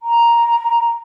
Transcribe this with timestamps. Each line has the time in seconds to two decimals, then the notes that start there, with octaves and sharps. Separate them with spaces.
0.01 A#5